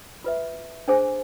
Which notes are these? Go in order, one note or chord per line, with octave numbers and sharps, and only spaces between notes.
F4 B4 E5
D4 G#4 C5 G#5